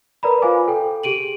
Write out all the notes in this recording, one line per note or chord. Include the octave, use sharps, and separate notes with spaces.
A#4 B4 D5 A#5 B5
F4 B4 C5 F5 G#5 D6
A4 G5
G4 G#4 D7 D#7 F#7